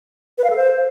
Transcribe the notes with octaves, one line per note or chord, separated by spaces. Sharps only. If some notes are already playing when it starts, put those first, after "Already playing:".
B4
F5
A4
C5